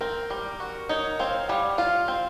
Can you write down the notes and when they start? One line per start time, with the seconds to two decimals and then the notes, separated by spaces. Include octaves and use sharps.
0.01 C4 A#4
0.30 G3
0.60 F#4
0.89 D#4 C#5
1.19 C4 F5
1.48 G3 F#5
1.78 F4 F5
2.08 C4